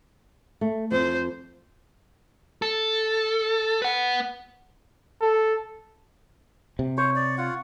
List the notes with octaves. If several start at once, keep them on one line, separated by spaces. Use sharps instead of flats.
A3
F2 C5
A4
B4 F#5
A4
C3
C5 C#5
D5
F4 F#5